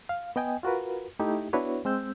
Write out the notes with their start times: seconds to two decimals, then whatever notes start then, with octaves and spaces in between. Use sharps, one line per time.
0.09 F5
0.36 B3 D#5 G5 G#5
0.63 F4 F#4 A#4 B4
1.19 A3 D#4 E4 G4
1.53 B3 D4 E4 F#4 B4 C#5
1.85 G#3 C4 E6 G6